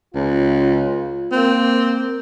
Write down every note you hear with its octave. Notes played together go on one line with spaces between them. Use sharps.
C#2 F4
A#3 C4